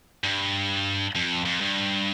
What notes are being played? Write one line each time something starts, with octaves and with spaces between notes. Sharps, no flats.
G2
F2
F2
G2